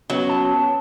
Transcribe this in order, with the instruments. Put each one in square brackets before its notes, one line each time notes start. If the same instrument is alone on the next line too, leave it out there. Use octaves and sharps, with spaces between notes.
[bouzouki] F#3 [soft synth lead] B3 [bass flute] C#4
[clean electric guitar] A5